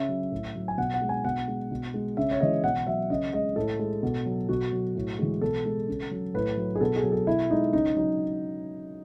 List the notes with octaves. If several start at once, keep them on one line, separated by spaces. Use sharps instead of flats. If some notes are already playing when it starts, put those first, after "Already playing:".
Already playing: C#3 E5
F#3
A2
F#3
G#5
B2 F#5
F#5
G#3
G#5
B2 F#5
G#3
B2
G#3
C#3 E5
C#5
E3 G#3 D#5
B2 F#5
F#3 E5
C#3 D#5
G#3 D#5
A2 A4
G#3
B2
F#3
B2 F#4
F#3
A2
E3 G#3
B2 A4
G#3
C#3
F#3
A2 B4
F#3
G#4
B2 A4
G#4
F#3
A4
B2 E4
G#3 D#4
C#3 D#4
F#3 D#4